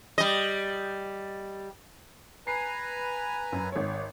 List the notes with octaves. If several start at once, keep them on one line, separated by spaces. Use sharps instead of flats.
G3 D#5
B4 G#5 A#5 C7
F#2
G#1 C#5